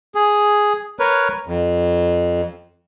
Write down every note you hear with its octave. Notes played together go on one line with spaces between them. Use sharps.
G#4
A#4 B4 C#5
F2